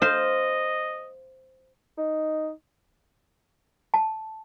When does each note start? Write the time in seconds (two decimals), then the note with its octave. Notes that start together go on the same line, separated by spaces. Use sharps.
0.02 C5 D#5 F5
1.98 D#4
3.94 A5